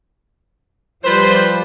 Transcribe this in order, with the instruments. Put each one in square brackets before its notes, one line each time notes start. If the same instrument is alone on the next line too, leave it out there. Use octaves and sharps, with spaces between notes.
[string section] F3 G3 [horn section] F4 B4 C5